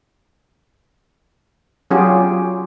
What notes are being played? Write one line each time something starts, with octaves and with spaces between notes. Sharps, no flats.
F#3 C#4 F4 G4 G#4